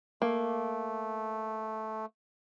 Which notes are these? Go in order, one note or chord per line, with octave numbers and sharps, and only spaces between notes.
A3 A#3